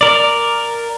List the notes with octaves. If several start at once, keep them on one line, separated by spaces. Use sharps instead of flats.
A#4 D5